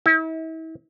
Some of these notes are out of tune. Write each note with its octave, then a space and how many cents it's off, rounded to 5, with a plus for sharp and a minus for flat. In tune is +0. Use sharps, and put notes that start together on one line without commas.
E4 -40